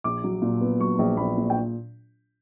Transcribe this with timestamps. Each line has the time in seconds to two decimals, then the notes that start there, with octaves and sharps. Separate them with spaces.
0.04 A#1 D6
0.24 F#3
0.42 A#2
0.61 B3
0.79 F#3 C#6
0.99 A#1
1.17 A#1 B5
1.37 A#2
1.50 G5